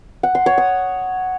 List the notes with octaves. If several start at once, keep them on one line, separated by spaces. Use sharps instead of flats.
F#5
C6
C#5
D#6